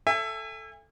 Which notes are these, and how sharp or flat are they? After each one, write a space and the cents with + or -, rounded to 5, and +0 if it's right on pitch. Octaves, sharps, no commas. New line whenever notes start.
A4 +0 E5 +15 G#5 -35